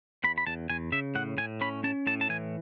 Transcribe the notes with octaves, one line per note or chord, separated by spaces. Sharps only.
E2 B5
B5
E2 A5
E2 G#5
C#3 E5
A2 F#5
A2 G#5
C#4 B5
C#4 A5
A2 A5
A5
E3 G#5